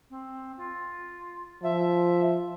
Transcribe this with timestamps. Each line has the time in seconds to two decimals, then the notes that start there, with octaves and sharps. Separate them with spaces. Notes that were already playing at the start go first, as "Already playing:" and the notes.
0.10 C4
0.57 F4
1.63 F3 E5